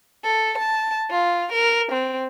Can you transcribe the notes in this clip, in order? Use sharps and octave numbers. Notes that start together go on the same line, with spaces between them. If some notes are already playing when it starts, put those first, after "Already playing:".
A4
A5
F4
A#4
C4